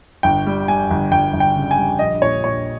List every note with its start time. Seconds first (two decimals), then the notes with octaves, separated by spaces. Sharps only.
0.23 G1 G5
0.46 G3
0.68 G3 G#5
0.90 G1
1.12 G1 G5
1.33 G1
1.40 G5
1.56 C#3
1.71 G#5
1.78 G3
1.99 A#1 D#5
2.22 A#2 C#5
2.44 A#2 C#5